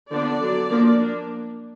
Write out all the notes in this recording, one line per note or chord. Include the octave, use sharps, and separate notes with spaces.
D3 F3 B3 D4 D5
D3 F#3 D4
F3 A#3 D4
A#3 D4